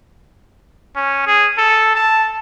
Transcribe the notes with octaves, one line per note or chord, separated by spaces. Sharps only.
C#4
G#4
A4
A5